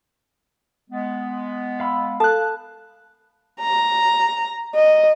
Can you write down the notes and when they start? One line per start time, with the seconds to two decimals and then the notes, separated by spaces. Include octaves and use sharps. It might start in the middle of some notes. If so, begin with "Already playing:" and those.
0.90 G#3 B3
1.80 F5 B5 E6
2.20 A4 F5 A5 F#6
3.60 A#5
4.75 D#5